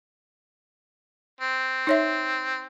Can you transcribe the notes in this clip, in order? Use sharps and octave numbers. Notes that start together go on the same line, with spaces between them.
C4
D#4 C#5 E5